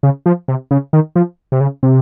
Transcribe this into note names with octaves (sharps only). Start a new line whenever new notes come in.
C#3
F3
C3
C#3
D#3
F3
C3
C#3
C3